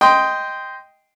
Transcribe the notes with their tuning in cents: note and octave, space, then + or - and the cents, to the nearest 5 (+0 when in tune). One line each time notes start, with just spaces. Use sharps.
D#5 +5 G5 +0 C6 -15